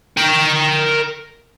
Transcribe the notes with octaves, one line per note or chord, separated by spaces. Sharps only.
A#4 G5